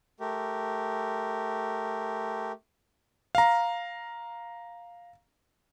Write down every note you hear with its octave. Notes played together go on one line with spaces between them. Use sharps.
A3 G4 A#4
F5 A#5